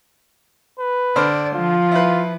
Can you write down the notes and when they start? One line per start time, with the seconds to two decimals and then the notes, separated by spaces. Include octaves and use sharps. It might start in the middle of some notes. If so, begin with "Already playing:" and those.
0.79 B4
1.16 D3 C5 D5 F6
1.55 F3 F4
1.91 E4 B4